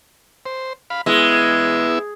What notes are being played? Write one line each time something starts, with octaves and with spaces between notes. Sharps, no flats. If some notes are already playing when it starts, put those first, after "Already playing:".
C5
F5 B5
G#3 B3 E4 E5